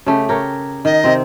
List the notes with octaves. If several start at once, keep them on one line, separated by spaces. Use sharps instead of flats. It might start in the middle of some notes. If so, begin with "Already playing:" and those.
C#3 A3 G4
G4 A#4 C#5
D#3 D#5
C3 C4